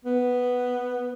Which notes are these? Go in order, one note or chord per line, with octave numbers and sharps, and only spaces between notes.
B3